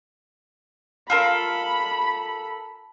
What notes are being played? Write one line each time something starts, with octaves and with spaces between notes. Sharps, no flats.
F4 A4 A#4 B5